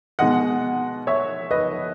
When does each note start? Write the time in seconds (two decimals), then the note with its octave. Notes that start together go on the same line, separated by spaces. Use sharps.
0.19 B2 G#3 D#4 D#5 F#5
1.07 C#5 E5
1.51 B4 D#5